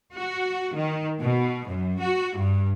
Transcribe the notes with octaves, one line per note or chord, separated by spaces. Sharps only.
F#4
D#3
B2
F#2
F#4
G2